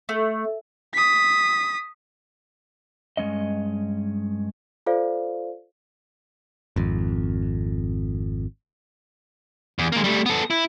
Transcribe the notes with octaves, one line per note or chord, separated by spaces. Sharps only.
A3
D#6 B6
G2 D#3 G#3 C#4 D#5
F4 A4 C5 D5 F5
G#1 F2
E2
G#3 A#3
G3 A3
B3 A4
E4